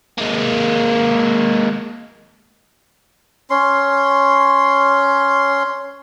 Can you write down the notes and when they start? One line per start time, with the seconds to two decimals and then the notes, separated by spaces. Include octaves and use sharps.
0.18 G#3 A#3
3.50 C#4 C6